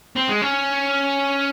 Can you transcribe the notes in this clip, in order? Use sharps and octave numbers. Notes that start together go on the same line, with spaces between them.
C4
G#3
C#4